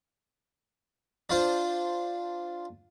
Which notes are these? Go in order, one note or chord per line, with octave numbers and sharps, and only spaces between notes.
D4 F4 C5